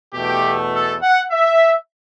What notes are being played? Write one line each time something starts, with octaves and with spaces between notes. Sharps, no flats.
E2 B2 A3 G4
A4
F#5
E5